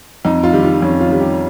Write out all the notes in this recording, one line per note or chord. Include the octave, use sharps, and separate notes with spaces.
F2 D#4
F4
D#3 G3
F4
F2 C#4
F4
D#3 G3
G4